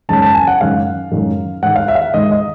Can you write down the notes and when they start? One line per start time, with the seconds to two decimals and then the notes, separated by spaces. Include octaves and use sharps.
0.09 F#2 D#3 G#3 C#4 A5
0.22 A5
0.34 G#5
0.47 F#5
0.60 F#2 D#3 G#3 C#4 F5
1.12 F#2 D#3 G#3 C#4
1.62 G#2 D#3 G#3 F#5
1.76 F5
1.88 E5
1.95 F5
2.01 E5
2.14 G#2 D#3 G#3 D#5
2.31 D#5